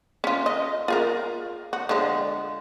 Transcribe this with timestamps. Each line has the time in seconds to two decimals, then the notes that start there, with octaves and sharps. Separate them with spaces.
0.24 C#4 F4
0.46 D#5
0.88 F4 G#4 A#4
1.73 F#4
1.89 D3 F3 G#3